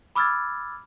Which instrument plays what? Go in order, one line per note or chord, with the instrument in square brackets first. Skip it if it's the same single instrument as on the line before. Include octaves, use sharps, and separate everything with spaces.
[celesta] B5 D6 E6 F6 G#6 A6